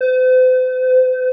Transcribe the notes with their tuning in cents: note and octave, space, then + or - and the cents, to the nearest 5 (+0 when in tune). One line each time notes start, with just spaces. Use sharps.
C5 -40